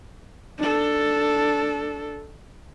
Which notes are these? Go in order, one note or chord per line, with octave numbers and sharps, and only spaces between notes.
D4 A4